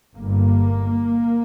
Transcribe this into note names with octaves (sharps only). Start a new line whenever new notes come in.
G1 G2 A#3